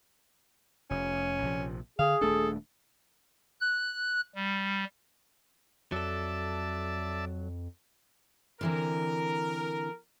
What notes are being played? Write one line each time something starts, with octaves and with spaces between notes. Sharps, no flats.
F1 C#4
A#1 C3 F3
D3 G#4 F5
D#1 A3 D4 A4
F#6
G3
F2 F#3 A4 D5 E5 A5
D3 E3 C4 A#4